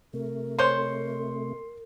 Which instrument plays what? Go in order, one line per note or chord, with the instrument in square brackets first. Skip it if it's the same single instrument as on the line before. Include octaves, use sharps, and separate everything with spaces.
[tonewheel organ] C3 A3 [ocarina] A#4
[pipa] G#3 C5 C#5 [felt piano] C6